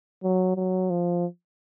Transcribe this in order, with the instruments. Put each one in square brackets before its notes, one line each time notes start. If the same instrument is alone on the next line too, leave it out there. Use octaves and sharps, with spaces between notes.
[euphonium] F#3
F#3
F3